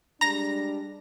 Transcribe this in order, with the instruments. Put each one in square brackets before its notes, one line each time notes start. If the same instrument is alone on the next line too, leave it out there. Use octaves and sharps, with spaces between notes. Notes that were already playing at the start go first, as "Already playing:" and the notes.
[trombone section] G3 G#3 D4 [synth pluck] A#5 A#6